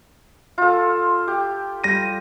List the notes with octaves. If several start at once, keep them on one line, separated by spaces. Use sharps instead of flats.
F4 A4
G4
G3 A#6 D#7